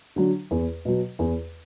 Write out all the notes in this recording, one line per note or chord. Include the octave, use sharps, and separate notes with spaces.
D3 F#3
E2
B2 F#3
E2